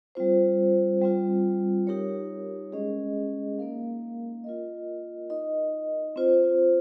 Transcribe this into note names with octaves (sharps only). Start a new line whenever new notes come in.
G3 C4 F4 C5
G3 C4 F4
D#4 G4 A#4 C#5
G#3 C#4 G#4 D#5
A#3 D#4 A#4 F5
F4 A#4 D#5
D#4 A#4 D#5
C4 F4 C5